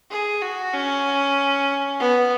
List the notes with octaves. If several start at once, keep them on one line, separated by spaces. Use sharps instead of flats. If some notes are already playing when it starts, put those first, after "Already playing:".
G#4
F#4
C#4
B3